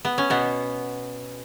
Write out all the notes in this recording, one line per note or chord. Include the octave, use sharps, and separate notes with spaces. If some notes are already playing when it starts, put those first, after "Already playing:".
B3
C#4
B2 B3